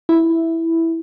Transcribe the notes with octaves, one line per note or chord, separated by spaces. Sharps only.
E4